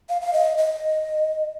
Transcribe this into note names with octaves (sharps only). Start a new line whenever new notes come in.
F5
F5
D#5
D#5